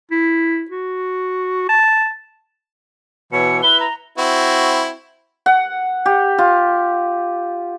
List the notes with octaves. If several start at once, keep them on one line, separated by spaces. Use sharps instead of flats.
E4
F#4
A5
B2 E3 C#5 C#7
E4 B4 G7
A#5
C4 E4 F#4
F#5
G4
F4